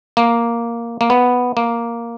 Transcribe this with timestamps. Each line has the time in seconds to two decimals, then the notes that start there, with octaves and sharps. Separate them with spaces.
0.17 A#3
1.01 A#3
1.10 B3
1.57 A#3